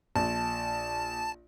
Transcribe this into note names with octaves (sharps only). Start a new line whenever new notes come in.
A#1 A5